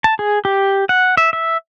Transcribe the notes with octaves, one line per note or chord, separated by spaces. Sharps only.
A5
G#4
G4
F#5
E5
E5